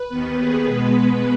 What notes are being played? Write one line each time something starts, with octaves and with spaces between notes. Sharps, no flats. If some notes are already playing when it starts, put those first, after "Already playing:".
Already playing: B4
D#2 D#3 B3
G#4
B2 G#3 B3 B4